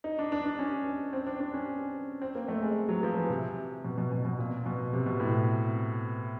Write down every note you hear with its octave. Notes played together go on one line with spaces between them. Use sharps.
D#4
D4
D4
D4
C#4
C4
D4
D4
C#4
C4
A#3
A3
G#3
F#3
F3
E3
C3
B2
B2
B2
B2
A#2
B2
C3
B2
A2